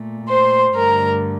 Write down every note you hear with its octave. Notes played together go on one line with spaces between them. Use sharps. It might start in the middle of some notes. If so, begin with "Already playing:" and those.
Already playing: A#2 A3
C5 C6
G2 D3 A3 A#4 A#5